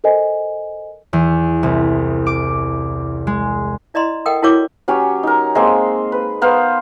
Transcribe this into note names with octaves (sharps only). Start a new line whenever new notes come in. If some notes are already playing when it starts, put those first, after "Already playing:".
A4 A#4 C5 D#5 G#5
E2
C2
D6
G#3
E4 D5 D#5 A#5 C6
A4 A#4 D#5 F#5 G5
E4 F#4 A#4 C#5 D6
F#3 C#4 G4 C#5
D#4 A#4
G#3 A#3 C4
B4
B3 A#4 C5 F5